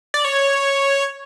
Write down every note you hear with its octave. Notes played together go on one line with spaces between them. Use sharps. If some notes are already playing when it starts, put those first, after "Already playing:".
D5
C#5